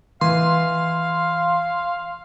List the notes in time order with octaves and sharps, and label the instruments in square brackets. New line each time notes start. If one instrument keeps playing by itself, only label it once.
[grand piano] E3 [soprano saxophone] F5 [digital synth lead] C6